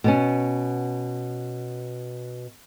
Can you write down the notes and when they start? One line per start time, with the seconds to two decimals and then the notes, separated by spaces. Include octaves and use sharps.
0.04 B2 B3 C#4